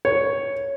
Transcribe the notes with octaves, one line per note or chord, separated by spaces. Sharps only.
C#5